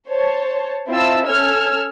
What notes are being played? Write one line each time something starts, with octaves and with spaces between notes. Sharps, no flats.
C5 C#5 A5
C4 E4 F4 D#5 A5 E6
C#4 A4 E6 F6 G#6